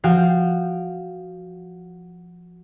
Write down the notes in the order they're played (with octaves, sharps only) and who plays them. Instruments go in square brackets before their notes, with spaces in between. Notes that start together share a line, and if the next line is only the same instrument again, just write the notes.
[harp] F3 F#4 F5 G5